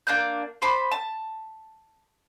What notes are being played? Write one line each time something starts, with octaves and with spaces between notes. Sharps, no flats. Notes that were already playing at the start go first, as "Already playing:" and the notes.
A#3 D4 F#6 G6
C5 A5 B5 D6
A5